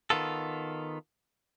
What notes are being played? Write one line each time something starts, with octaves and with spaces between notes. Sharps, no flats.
D#3 B3 F4 A4